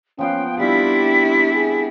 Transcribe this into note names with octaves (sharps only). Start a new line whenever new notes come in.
F3 B3 C#4 F5 G5
G3 B3 C4 D4 E4 G4 B6
G#4